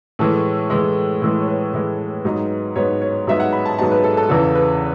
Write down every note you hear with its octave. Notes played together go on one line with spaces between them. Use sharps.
A2 E3 G#3 A4
A2 E3 G#3
A2 E3 G#3
C#5
B4
A2 E3 G#3
G#2 F#3 B3 D#4
G#2 F#3 B3 D#4 C#5
C#5
G#2 F#3 B3 D#4 E5
F#5
B5
A5
G#2 F#3 B3 D#4 A5
B4
A4
A4
E2 C#3 E3 A4
B4